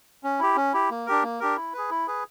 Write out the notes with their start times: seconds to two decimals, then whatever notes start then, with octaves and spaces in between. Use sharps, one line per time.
0.24 C#4
0.40 E4 G4
0.56 C#4
0.73 E4 G4
0.90 A#3
1.06 D4 G4 A#4
1.23 A#3
1.40 D4 G4 A#4
1.57 E4
1.73 G#4 B4
1.90 E4
2.07 G#4 B4